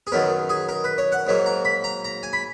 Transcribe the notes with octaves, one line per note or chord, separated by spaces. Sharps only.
G#4
F#2 D#3 F#3 B3 A#4
G#4
A#4
B4
C#5
F#5
G#2 F#3 A#3
A#5
B5
A#5
A#5
G#5
B5